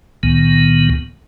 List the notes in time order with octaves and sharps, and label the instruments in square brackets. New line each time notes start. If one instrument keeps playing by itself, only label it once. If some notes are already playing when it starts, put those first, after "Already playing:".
[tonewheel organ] C#2 A#2 D#3 B3